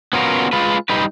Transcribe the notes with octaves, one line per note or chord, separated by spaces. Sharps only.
B3 C#4 F4 F#4 A#4
G#3 F4 B4
G3 D#4 B4